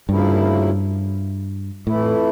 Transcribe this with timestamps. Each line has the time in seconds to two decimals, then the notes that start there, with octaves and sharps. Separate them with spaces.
0.09 D2 G2 C#3 F3 A#3 E4
1.87 F2 A2 E3 A3 E4